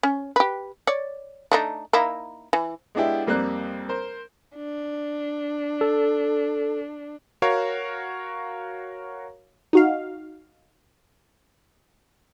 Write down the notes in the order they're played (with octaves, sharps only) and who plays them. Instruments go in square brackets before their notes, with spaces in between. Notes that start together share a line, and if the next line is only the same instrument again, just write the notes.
[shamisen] C#4
G4 B4
C#5 D5
A3 D4 D#4
A#3 D#4 E4
E3
[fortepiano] G#3 B3 D4 E4 G4
F2 G3 A#3 C4 D5 F#6
A#4 C5
[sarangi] D4
[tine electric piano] A4
[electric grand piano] F#4 A#4 C#5 F5
[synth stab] D#4 F#4 F5